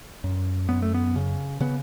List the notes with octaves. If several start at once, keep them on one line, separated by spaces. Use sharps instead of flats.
F#2
F#2 B3
A3
B3
C#3
C#3 B3